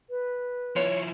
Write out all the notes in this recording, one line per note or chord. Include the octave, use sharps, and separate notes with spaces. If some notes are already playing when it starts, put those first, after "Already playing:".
B4
F3 E4 C#5